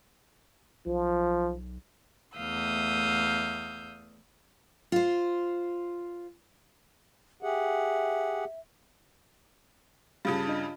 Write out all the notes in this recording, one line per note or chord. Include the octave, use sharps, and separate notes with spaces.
B1 F3
E2 A3 F5 D#6 E6 G6
F4 C5
G4 G#4 E5 F#5
G2 C#3 G3 F4 F5
D4 D#5